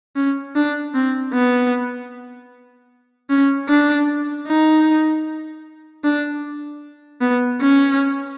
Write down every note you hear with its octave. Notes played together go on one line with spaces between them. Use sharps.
C#4
D4
C4
B3
C#4
D4
D#4
D4
B3
C#4